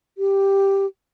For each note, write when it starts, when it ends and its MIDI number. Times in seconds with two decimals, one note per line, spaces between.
0.18 0.86 67